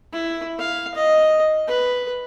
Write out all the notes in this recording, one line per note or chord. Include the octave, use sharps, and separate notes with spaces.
E4
F5
D#5
B4